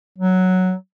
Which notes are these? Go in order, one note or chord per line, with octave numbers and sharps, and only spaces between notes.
F#3